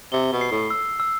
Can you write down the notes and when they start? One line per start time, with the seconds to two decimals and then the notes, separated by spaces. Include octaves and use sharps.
0.12 C3 G7
0.32 B2
0.41 C7
0.51 A2
0.70 E6
1.00 E6